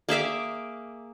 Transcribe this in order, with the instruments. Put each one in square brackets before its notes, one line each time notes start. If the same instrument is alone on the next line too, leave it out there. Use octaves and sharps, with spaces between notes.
[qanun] A#3 G#4 E5 D6